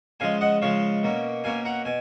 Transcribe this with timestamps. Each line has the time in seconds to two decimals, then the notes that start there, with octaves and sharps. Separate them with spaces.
0.20 C#3 F3 G#3 F5 G#5
0.41 D#5 F#5
0.62 C#3 F3 G#3 C#5 F5
1.03 B2 A#3 C#4
1.44 B2 A#3 C#4 F5 G#5
1.65 F#5 A#5
1.85 B2 G#5